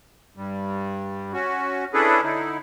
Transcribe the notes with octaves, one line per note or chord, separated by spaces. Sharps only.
G2 G3
C#4 F#4
C#4 D4 E4 G#4 A4 B4
D3 D#4 E4